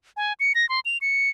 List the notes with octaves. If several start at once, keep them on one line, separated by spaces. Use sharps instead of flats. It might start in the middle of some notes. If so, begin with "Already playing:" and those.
G#5
C#7
A#6
C6
F7
C#7